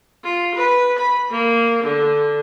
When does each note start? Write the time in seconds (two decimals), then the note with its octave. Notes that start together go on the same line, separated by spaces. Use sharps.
0.24 F4
0.56 B4
0.99 B5
1.31 A#3
1.84 D3